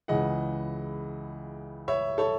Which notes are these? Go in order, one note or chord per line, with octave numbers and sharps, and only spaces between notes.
C#2 C#3 E3 G#3 D#5 F#5
C#5 E5
A4 C#5